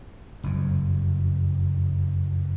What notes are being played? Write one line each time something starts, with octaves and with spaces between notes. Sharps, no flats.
F#1 F2